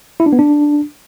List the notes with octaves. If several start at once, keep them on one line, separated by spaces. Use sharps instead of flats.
E4
D4
B3
D4